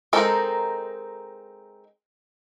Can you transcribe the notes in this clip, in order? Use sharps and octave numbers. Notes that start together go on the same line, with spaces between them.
G#3 C4 D#4 A4 A#4